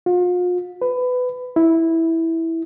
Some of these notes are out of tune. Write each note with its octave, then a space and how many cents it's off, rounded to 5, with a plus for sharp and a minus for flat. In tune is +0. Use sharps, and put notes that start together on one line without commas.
F4 +40
B4 +20
E4 -10